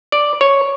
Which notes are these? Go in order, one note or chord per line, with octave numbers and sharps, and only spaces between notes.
D5
C#5